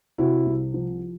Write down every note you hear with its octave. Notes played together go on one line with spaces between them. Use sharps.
C3 E4 F#4
C2
F3